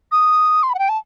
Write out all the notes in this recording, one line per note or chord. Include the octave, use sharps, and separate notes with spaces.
D#6
C6
B5
F#5
G5
A5